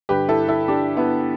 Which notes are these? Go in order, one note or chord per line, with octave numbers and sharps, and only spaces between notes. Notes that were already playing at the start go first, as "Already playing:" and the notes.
G2 D3 G4 B4
E4 A4
E4 A4
D4 G4
B3 E4